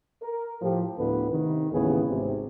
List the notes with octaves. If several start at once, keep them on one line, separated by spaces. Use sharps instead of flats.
A#4
A2 F3 G4
D2 A2 D3 B3 B4
C3 D#3
A1 D#2 A2 C#3 B3 G#4
G#1 C3